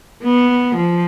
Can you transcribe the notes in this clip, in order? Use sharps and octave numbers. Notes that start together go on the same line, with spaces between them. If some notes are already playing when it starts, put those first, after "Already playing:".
B3
F3